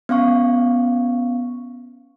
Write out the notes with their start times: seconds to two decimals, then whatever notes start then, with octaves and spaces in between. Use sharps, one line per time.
0.09 B3 C#4 F5 C#6